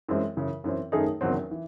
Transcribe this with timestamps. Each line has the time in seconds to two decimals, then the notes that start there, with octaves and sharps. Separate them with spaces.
0.09 F#2 E3 G#3 C4 E4
0.37 F#2 C#3 E3
0.64 F#2 E3 C4
0.92 F#2 D#3 A3 D#4 G#4
1.21 F#1 E2 D#3 F#3 C4
1.51 E3